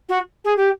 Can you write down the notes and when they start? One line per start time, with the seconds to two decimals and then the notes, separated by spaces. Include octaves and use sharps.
0.08 F#4
0.44 G#4
0.56 G4